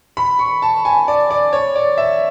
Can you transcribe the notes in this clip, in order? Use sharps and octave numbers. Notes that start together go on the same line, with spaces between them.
B5
C#6
A5
G#5
D5
D5
C#5
D5
E5